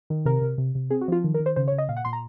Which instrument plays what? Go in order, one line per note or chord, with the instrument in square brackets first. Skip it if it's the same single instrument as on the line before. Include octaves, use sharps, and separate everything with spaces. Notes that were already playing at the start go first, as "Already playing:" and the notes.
[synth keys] D#3
C3 A#4
C3
C3
C3
C4 G#4
F#4
F3 F4
D#3
A#4
D#3
C5
C#3 C5
C#5
C#3
D#5
A#2 F5
F#5
A#2 C6
A#5